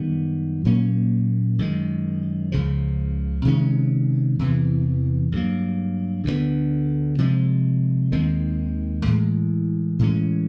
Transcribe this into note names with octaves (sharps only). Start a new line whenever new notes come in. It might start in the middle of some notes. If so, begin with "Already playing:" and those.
Already playing: F#2 D#3 G3 B3
A#2 F#3 A#3 C#4
F#2 D#3 G#3
C#2 C#3 F3
C3 D#3 G#3 C#4
E2 C3 E3
G2 D3 F#3 A#3
D2 D3 G3 B3
C3 F3 G#3
D#2 D#3 G#3 C4
A2 E3 G#3
A2 E3 G#3 C#4